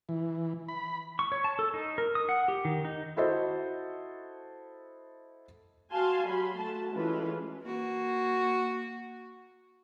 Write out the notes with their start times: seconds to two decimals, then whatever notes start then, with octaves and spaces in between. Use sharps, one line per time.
0.09 E3
0.68 B5
1.19 C#6
1.32 C#5
1.44 A5
1.59 A4
1.74 D#4
1.98 A#4
2.15 D#6
2.29 F#5
2.48 G4
2.65 D#3
2.85 D#4
3.17 E4 F#4 A4 C5 D#5
5.91 F#4 F5 G#5 A5 C6
6.26 F#3 G4 B5 C6
6.57 A3 F#4 A5
6.91 E3 G#3 A3 C#4 F4 B4
7.63 A#3 F#4